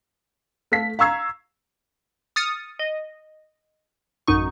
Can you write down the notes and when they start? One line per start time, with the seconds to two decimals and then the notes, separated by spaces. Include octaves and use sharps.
0.72 A3 A4 F5 B6
0.99 F5 A#5 C#6 E6 G#6 C7
2.36 D#6 F6 A6 C#7 D#7
2.79 D#5
4.28 A1 F#2 D#4 C#6